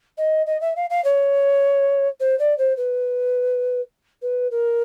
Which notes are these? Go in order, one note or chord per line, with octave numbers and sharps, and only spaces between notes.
D#5
D#5
E5
F5
F5
C#5
C5
D5
C5
B4
B4
A#4